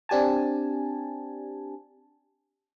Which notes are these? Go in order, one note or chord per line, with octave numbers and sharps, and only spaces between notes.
C4 D4 G4 G#5 A5